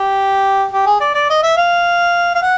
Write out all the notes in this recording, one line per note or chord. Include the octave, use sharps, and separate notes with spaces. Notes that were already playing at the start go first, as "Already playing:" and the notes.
Already playing: G4
G4
G#4
D5
D5
D#5
E5
F5
F5
F#5